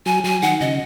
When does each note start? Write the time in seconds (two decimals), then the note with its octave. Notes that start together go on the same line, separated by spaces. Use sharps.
0.06 F#3 G#5
0.24 F#3 G#5
0.42 D#3 F#5
0.61 C#3 D#5